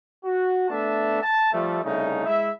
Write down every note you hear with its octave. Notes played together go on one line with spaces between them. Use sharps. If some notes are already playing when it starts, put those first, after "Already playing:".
F#4
A3 B3 D4 E5 A5
A5
F3 G3 A3
C2 C#3 A3 D#4
G#3 E4 E5